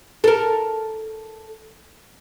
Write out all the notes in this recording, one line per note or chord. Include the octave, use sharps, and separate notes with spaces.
A4 A#4